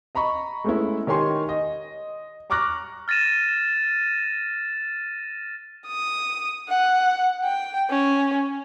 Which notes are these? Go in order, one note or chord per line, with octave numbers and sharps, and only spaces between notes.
D#5 A#5 B5 C#6
G#3 A3 B3 C#4 E4
D#3 G4 C#5 G#5 C6
D#5
A#5 C#6 D6 F6 F#6 A#6
F6 A6 A#6 D#7 E7
D#6
F#5
G5
C#4